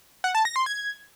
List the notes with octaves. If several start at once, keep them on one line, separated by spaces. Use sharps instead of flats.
F#5
A5
A#6
C6
G#6